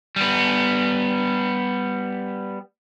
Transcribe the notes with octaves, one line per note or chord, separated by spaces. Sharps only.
G3 B3